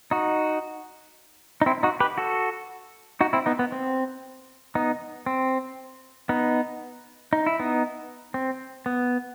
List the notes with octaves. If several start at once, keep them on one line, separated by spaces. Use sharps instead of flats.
D#4 F#4
D#4
C4 E4
D#4 F#4
G4 B4
F#4 A4
D#4 F#4
C4 E4
B3 D#4
B3
C4
B3 D#4
C4
B3 D#4
D#4
E4
B3 D#4
C4
B3